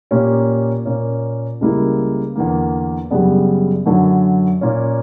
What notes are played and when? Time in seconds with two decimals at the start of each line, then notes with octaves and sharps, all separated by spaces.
0.11 A#2 A#3 C#4 G4
0.85 A#2 A#3 C#4
1.61 C#2 C#3 G3 A#3 E4
2.36 E2 D3 A#3
3.11 F#2 C#3 G3 B3 D4
3.86 F#2 D3 F#3
4.61 A#2 A#3 C#4